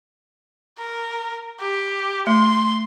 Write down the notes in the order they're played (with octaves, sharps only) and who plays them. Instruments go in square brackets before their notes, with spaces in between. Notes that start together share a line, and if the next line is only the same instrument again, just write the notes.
[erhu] A#4
G4
[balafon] A3 [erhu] C6